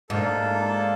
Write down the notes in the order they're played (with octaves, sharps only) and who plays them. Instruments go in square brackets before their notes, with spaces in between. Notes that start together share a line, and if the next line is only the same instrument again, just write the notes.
[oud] G#2 [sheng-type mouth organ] A#3 D4 F4 A4